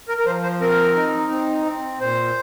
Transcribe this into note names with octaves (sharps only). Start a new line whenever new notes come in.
A#4
A#4
F3 C5
C5
C4 A#4
D#4
C4
C4
A#2 C5